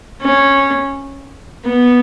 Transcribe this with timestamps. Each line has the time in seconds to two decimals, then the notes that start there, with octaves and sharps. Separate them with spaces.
0.21 C#4
1.65 B3